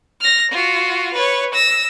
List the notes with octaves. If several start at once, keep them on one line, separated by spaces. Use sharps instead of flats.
F6 A#6
F4 F#4
B4 C#5
E6 A#6